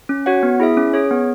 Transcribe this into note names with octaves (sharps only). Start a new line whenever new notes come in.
C#4
F#4 C#5 F#5
B3
E4 G#4 E5
C#4
G#4 C#5
B3